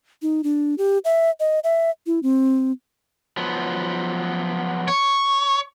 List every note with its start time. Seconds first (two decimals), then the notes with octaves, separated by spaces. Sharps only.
0.22 D#4
0.44 D4
0.78 G4
1.05 E5
1.40 D#5
1.64 E5
2.06 E4
2.23 C4
3.37 F3 F#3 B3
4.88 C#5